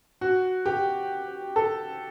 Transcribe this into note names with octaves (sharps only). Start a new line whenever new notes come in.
F#4
G4
A4